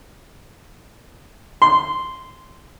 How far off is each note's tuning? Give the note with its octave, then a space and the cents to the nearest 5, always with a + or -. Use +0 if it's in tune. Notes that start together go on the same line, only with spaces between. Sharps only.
C6 -10